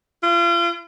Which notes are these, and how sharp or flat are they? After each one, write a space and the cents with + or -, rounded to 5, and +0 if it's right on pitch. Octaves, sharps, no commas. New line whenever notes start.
F4 -35